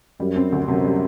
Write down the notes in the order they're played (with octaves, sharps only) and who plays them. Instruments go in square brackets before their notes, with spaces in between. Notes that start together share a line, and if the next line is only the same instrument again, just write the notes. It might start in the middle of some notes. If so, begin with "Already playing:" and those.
[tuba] F#2 [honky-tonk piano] G3
[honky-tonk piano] C4
D2
[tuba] F#2 [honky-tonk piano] C3
[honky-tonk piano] G3